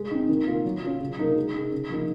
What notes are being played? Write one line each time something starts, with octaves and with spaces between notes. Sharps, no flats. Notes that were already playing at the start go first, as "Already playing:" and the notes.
Already playing: G#3
C4 D#4
D#3
A#3 F4
F#3
C#4 F4
C#3
F#3 A#3 D#4 A#4
G#3
D#4 G#4
C#3
F3 A#3 D#4